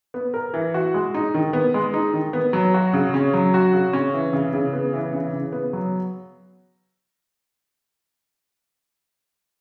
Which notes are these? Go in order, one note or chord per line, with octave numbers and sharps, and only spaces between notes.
B3
A#4
E3
F#4
G#3
D#4
D#3
B3
G#3
D#4
D#3
B3
F#3
F#4
C#3
C#4
F#3
F#4
C#3
C#4
E3
C#3
C#3
B3
E3
C#3
C#3
B3
F#3